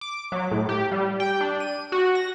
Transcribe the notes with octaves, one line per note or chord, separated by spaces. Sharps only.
D6
F#3
A2
G4
G3
G5
D4
D#7
F#4
A#6